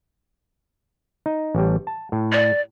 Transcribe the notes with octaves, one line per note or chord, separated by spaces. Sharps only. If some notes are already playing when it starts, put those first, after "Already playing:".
D#4
A1 G3
A5
A2
D5